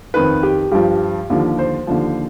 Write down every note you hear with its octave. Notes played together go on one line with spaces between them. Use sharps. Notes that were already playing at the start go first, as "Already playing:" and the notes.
F2 D#3 B4
G4
G2 F3 G4
D#2 D3 F3
C5
D#2 D3 F3